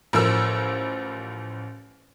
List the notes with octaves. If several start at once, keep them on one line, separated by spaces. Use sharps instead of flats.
A1 F3 A#4 E6